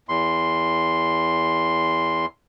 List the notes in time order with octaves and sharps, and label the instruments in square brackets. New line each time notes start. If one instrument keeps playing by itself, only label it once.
[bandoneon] E2 C6